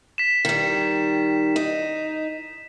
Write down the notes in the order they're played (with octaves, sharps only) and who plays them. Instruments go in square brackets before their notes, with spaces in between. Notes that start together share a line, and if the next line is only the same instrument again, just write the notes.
[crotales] B6 E7
[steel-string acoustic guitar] D#3 G3
D#4